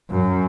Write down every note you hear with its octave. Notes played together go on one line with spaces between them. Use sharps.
F#2